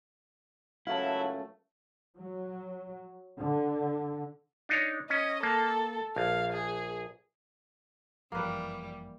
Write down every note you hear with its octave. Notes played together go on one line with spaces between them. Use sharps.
C#2 F#2 F#3 A3 E4 F5 A5
F#3
D3
D4 D#4 C#5
C#4 D#5
A#3 A4
A#1 F5
G#4
G1 F#2 E3 F3 G3 A#3 B4